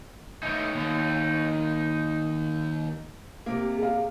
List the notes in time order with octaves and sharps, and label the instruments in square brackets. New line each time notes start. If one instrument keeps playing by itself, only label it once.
[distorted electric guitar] E3 A3 [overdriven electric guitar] D#4 C#5
[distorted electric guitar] D#2
[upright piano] C3 A#3
[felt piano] G#4 F5